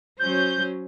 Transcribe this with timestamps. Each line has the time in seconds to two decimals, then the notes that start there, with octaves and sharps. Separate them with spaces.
0.19 F#3 C#4 C5 G6